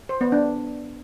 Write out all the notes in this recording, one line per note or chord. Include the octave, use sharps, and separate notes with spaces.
C5
B3
D4